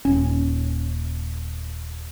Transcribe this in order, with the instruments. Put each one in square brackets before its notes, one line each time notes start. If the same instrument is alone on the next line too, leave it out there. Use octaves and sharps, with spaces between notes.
[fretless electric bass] D#1 C#4